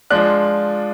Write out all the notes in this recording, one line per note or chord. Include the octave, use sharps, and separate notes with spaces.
F3 G#3 D4 F#6